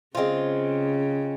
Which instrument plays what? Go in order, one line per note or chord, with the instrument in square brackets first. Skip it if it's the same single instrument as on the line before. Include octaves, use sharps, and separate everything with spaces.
[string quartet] C#3 [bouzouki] G#3 C4 F4